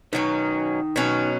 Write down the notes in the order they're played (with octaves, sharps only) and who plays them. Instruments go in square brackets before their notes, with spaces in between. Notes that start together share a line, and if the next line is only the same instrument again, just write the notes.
[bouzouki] B2 F#3 C#4 [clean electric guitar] D#3 D#4
[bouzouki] B2 F#3 C#4